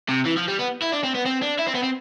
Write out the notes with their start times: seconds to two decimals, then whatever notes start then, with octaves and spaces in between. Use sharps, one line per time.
0.09 C3
0.26 E3
0.37 F3
0.48 G3
0.59 B3
0.82 E4
0.92 D4
1.04 C4
1.15 B3
1.26 C4
1.42 D4
1.59 E4
1.67 C4
1.75 B3
1.83 C4